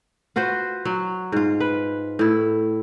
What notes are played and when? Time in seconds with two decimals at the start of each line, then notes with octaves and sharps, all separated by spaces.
0.36 F4 F#4 B4 C5
0.85 F#3
1.32 G#2 F4
1.60 B4
2.19 A2 E4